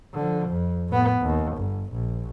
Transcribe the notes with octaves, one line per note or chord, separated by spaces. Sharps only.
D3 F3
F2
A2 B3
D#2
G1
A#1